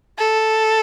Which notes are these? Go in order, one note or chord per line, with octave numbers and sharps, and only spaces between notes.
A4